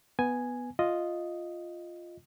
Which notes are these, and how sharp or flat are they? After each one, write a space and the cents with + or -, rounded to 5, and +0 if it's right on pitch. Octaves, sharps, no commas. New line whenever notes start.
B3 +0 G#5 +0
F4 +0 D#5 +0